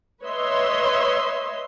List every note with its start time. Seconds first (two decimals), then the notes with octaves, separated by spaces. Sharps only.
0.24 B4 C#5 D#5 E5 C6